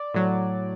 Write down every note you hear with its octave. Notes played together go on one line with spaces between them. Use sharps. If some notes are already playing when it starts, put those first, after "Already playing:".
Already playing: D5
A2 F#3